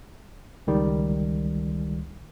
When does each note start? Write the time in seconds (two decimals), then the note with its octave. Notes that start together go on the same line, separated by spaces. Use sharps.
0.67 C#2 D#3 G3